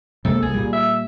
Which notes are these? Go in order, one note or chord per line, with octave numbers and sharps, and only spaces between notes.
C3 G#3 A#3 A4
C2 G#4
A#2 G3
E5